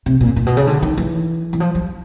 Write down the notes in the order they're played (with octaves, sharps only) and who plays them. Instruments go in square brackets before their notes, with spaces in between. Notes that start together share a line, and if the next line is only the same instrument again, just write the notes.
[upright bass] C3
A#2
A#2
B2
C#3
D3
D#3
E3
E3
F3
G3